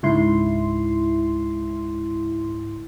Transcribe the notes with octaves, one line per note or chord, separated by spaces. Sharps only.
C#2 G#2 E4 C6